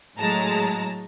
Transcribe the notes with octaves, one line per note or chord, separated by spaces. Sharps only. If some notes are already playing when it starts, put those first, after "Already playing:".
A2 F#3 G#3 A5 A#5